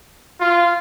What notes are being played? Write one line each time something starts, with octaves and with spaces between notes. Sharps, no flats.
F4